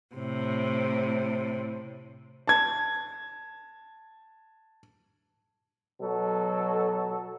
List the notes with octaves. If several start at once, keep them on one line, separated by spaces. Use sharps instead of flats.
A2 C3
A5 G#6
B2 F#3 A4